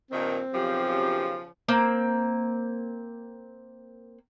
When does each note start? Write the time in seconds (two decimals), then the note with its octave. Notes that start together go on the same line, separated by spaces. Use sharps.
0.11 G2 A#2 D#3 C4
0.53 B1 F#2 C#3 F3 G4
1.68 A#3 C4